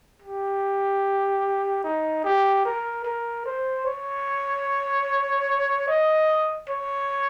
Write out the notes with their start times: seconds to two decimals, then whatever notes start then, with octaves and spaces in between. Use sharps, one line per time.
0.22 G4
1.84 D#4
2.24 G4
2.65 A#4
3.05 A#4
3.45 C5
3.85 C#5
5.88 D#5
6.69 C#5